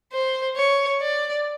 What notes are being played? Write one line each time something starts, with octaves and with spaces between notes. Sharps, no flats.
C5
C#5
D5